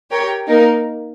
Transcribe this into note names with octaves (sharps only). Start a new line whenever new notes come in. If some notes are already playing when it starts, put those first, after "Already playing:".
G4 A#4 C#5 G5
A#3 D#4 A#4